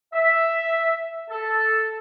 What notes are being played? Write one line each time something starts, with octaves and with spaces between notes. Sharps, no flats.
E5
A4